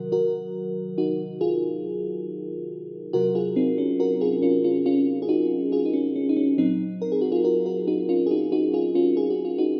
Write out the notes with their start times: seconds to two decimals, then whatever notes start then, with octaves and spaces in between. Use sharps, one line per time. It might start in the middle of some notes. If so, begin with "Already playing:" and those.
Already playing: C3 D#3 F#3 F#4 A#4
0.12 F#4 A#4
0.98 D#4 F#4
1.41 F4 G#4
3.13 C3 F#3 F#4 A#4
3.35 F4 G#4
3.56 C4 D#4
3.78 C#4
4.00 F#4 A#4
4.21 F4 G#4
4.42 C#4 F4
4.64 C#4 F4
4.86 C#4 F4
5.22 G#4
5.29 D#4 F#4
5.72 F4 G#4
5.86 D#4
5.94 C#4
6.16 C#4
6.29 D#4
6.37 C#4
6.58 A#2 F#3 C4 D#4
7.02 A#4
7.12 G#4
7.21 F#4
7.32 F4 G#4
7.44 F#4 A#4
7.66 F#4 A#4
7.87 D#4 F#4
8.09 C#4 F4
8.27 G#4
8.31 D#4 F#4
8.52 D#4 F#4
8.74 F4 G#4
8.95 C#4 F4
9.17 G#4
9.30 F#4
9.45 F4
9.58 D#4 F#4